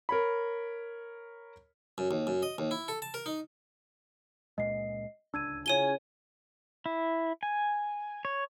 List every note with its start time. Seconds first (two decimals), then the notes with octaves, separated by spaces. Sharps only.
0.09 A#4 C#5 B5
1.98 F#2
2.11 D#2
2.27 F#2
2.43 D#5
2.58 D#2
2.71 E4
2.88 A4
3.02 A5
3.14 A#4
3.26 D#4
4.58 C#2 A#2 G#3 D#5 C7
5.34 D1 C#2 D4 E6 G#6 D#7
5.66 C#3 E4 F4 C#5 G#5 D#7 G7
6.86 E4
7.43 G#5
8.25 C#5